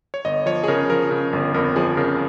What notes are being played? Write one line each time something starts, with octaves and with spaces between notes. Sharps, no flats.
C#5
G1 D#5
F3 C#5
G#4
C#3 A#4
F3 A#4
C#3
G1
F2 A#4
F3 G#4
C#3 A#4